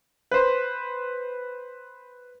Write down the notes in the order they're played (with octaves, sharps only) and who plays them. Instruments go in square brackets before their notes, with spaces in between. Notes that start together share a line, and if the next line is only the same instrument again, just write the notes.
[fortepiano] B4 C5